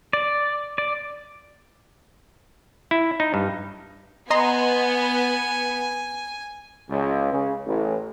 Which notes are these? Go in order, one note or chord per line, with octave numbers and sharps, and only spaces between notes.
D5
D5
E4
D#4
G2
B3 D#5 G#5 A#5 C6
C#2
C#3
A1